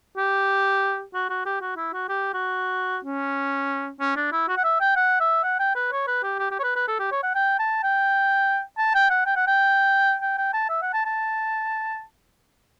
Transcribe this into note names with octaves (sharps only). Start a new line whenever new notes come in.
G4
F#4
F#4
G4
F#4
E4
F#4
G4
F#4
C#4
C#4
D4
E4
F#4
F#5
E5
G5
F#5
E5
F#5
G5
B4
C#5
B4
G4
G4
G4
C#5
B4
B4
A4
G4
C#5
F#5
G5
A5
G5
A5
G5
F#5
G5
F#5
G5
G5
G5
A5
E5
F#5
A5
A5